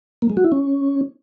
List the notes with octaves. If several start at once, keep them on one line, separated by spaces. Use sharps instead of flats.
A#3
G#3
F#4
E4
C#4